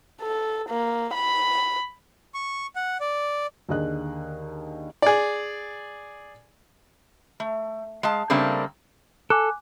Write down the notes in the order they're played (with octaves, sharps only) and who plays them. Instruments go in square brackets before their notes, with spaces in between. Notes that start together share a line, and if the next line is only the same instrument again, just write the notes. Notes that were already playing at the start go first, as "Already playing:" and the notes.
[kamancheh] A4
A#3
B5
[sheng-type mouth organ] C#6
F#5
D5
[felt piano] D#2 D3 G#4 D#5 F#6
[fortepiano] G#4 D5
[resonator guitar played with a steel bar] A3
G#3 F5 A5
C#3 G3 A3 A#3 C4 D4
[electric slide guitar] A4 [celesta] G#5 D6 F#6